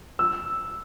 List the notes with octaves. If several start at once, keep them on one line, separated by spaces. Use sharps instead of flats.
E6